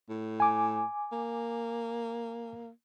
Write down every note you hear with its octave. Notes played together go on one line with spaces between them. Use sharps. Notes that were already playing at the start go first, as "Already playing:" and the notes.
A2
G#5 D6
A#3